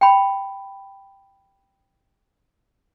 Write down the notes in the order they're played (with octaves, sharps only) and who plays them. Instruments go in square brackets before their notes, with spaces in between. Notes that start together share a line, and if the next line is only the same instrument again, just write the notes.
[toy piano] G5 B5